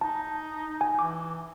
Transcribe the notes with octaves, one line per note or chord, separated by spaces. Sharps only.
D#4 A5
G#5
E3 D6